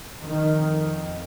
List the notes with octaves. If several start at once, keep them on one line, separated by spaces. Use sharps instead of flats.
F2 D#3